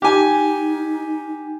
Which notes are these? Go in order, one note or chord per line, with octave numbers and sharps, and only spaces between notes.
D#4 G4 G#5